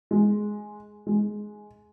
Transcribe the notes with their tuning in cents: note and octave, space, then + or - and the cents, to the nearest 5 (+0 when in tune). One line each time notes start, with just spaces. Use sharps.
G#3 +5
G#3 +10